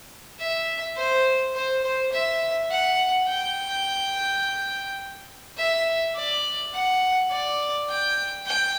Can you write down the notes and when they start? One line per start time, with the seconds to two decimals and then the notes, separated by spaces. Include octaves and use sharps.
0.40 E5
0.97 C5
1.55 C5
1.84 C5
2.12 E5
2.70 F#5
3.28 G5
5.58 E5
6.16 D5
6.74 F#5
7.31 D5
7.89 G5
8.46 G5